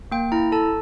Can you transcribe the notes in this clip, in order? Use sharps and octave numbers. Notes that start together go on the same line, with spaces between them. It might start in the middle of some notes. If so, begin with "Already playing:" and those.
A#3 G5
E4 A#5
A4 A5